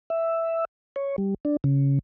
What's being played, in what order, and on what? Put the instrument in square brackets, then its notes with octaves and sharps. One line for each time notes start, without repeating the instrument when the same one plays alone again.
[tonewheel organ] E5
C#5
G3
D4
C#3